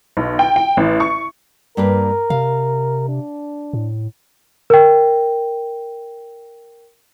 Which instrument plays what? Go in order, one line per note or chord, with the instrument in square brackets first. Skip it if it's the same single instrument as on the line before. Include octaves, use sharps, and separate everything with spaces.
[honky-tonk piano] B1
G5
G5
A1
C#6
[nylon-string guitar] G2 A#3 B4 [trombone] A#4
[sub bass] C3 [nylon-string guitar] F5
[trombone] D4
[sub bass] A2
[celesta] A#4 G5